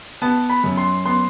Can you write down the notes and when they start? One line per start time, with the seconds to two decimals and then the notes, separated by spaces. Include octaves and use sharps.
0.22 B3 A5
0.50 B5
0.64 F#2
0.77 C6
1.06 B3 C6